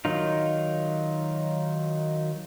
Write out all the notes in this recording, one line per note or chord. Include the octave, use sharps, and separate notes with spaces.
D#3 F#3 D#4 F4